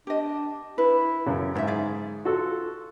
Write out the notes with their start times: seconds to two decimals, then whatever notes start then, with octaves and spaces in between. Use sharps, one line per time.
0.07 D4 G4 D#5
0.78 E4 B4
1.26 F#2 C#3
1.55 G#2 F#3 C5 E5
1.67 D3 G#4 D5
2.25 F4 F#4 A4